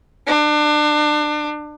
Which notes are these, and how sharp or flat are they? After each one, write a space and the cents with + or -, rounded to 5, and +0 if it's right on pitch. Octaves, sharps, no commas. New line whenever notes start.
D4 +30